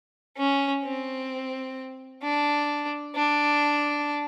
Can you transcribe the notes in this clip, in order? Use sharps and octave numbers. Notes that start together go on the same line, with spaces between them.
C#4
C4
D4
D4